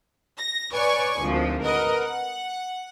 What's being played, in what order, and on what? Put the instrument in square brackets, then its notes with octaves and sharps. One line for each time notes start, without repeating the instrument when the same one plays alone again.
[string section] A#6
B4 C#5 D5 G#5 C#6
G#1 D2 F3
A#4 B4 D#5 F#5
F#5